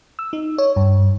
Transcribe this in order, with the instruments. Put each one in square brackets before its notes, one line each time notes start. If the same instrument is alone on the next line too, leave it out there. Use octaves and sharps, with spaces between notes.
[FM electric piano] E6
D#4
C#5
G2